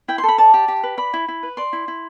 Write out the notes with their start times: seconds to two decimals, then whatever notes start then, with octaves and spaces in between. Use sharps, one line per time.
0.08 E4 G5
0.18 C6
0.24 A4 B5
0.38 D5 A5
0.54 G4
0.68 G4
0.83 B4
0.97 D5 B5
1.14 E4
1.28 E4
1.43 B4
1.57 D5 C6
1.73 E4
1.88 E4